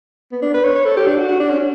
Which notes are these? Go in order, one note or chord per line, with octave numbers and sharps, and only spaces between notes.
B3
D4
B4
C#5
C#5
A4
G4
D4
F#4
F#4
D4
C#4